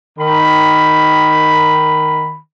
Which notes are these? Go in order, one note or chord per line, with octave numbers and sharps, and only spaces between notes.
D#3 B5